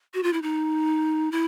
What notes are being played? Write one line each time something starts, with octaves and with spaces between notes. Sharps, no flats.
F#4
F4
E4
D#4
E4